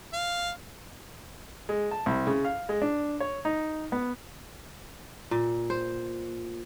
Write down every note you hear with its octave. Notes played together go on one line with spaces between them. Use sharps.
F5
G#3
A5
C2
C#3
F5
G#3
D4
C#5
D#4
B3
A#2
C5